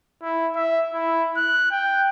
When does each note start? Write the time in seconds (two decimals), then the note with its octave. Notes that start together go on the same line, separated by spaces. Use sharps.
0.22 E4
0.56 E5
0.94 E4
1.37 F#6
1.71 G5